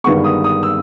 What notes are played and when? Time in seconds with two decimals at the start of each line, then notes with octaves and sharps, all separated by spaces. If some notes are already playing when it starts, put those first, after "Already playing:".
0.04 G1 G2 D#3 G#3 B3 C#6
0.24 D#6
0.44 D#6
0.63 E6